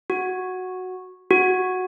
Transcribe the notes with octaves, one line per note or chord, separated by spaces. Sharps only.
F#4
F#4